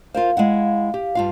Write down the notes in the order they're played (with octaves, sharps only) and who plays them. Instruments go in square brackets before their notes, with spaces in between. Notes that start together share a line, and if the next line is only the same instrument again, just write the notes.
[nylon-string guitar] F4 A#4 C5 [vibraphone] F5
[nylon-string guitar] G#3 E4 F#5
G4
G2 F4 F5